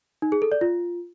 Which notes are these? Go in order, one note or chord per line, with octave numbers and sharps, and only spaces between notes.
D#4
G#4
A4
D5
F4